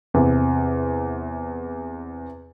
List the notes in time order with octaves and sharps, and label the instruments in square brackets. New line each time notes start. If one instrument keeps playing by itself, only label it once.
[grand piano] E2 C3